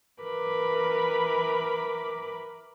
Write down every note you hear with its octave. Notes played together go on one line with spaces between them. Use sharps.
E3 A#4 B4 B5 D6